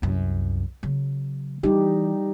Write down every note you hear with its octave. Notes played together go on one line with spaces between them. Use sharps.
C2 F#2
C#3 F#3
E3 G3 D#4 G4